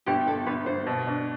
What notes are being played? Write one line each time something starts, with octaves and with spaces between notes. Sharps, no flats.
G1 G4
G1 A4
G1 B4
G1 C5
B2
D4